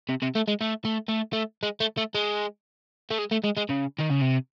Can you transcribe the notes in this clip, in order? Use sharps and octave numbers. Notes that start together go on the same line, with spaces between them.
C3
C3
A3
G#3
A3
A3
A3
A3
G#3
A3
A3
G#3
A3
G#3
A3
G#3
G#3
C#3
D#3
C#3
C3